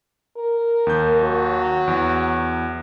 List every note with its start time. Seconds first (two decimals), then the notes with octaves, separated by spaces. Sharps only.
0.36 A#4
0.87 D#2 G6
1.20 F#3
1.88 E2